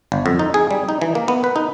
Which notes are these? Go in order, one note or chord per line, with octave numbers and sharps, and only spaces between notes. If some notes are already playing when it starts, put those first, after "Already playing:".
G1
F2
D#4
G#4
G3
D#4
E3
A#3
B3
B4
D#4